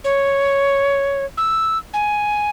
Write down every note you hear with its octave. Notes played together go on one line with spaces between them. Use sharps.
C#5
E6
G#5